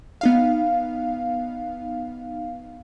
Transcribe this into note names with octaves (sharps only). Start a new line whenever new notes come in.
B3 D#4 F5